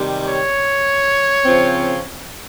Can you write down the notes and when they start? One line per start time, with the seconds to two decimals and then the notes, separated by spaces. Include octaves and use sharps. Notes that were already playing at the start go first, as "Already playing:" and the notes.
Already playing: C3 D#3 G3
0.28 C#5
1.45 C#3 F3 C4